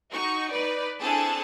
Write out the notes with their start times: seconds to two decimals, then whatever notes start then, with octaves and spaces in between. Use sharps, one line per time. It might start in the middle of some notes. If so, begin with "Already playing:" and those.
0.11 D#4 F#4 C#6
0.51 D#4 B4 D5
1.01 C4 D4 E4 G#4 A4 A5